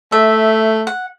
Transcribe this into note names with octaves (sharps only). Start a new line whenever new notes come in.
A3 E5
F#5